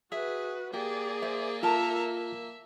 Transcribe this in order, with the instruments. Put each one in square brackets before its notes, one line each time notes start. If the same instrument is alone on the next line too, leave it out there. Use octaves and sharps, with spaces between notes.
[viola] F#4 B4 [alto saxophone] G#4 [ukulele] E5
[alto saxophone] A#3 [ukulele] G4 [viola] G#4 D5
[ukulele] C5 E5
[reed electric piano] F4 [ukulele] A4 A#4 A5 [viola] E5 A#5
[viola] E5